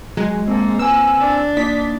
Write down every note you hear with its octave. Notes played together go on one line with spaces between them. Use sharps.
F#3 G#3
A#3 C4 A4
B4 G#5 E6
D4
A#3 D#4 D5 B6